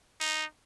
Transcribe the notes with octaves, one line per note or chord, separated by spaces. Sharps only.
D#4